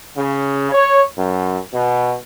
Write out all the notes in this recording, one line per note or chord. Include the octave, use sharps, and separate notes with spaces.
C#3
C#5
F#2
B2